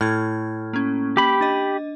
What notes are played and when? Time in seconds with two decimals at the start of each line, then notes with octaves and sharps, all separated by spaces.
0.01 A2 F6 G#6
0.73 A#3 C#4
1.17 G4 B5
1.41 D4 D#5